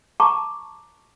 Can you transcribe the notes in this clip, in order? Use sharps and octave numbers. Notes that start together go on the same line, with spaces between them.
A5 A#5 C#6 D6